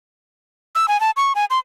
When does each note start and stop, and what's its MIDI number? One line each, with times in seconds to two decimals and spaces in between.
0.75 0.86 88
0.88 1.00 80
1.00 1.10 81
1.17 1.33 85
1.35 1.45 80
1.50 1.59 84